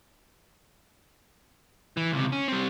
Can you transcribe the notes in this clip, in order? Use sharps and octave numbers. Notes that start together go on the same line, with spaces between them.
E3
C#2 C3
C#4
G3 C4